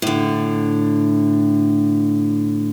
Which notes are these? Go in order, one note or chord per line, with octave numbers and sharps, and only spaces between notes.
A2 D3